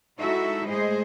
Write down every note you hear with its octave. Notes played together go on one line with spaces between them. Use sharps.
G#3 D#4 E4 F#4 A4 E5
A2 G#3 G#4 C5 D#5